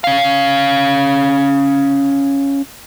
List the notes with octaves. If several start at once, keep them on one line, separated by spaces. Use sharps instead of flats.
C#4 F5